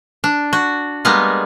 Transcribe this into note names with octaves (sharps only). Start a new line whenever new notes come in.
D4
F#4
G3 G#3 A#3 B3